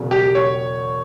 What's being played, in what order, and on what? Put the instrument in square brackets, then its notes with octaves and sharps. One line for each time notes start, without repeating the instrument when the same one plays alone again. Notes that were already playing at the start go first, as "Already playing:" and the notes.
Already playing: [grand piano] E1 E2 C#3 F#3
[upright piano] G4
C#5